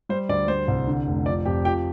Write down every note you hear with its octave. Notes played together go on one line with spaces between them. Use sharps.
G3 C5
D2 D5
G3 C5
C2
D3
F1
F3 D5
F2 G4 G5
F3 G4 G5